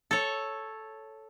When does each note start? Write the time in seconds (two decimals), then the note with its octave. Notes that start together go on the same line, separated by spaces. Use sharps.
0.11 A4 C#5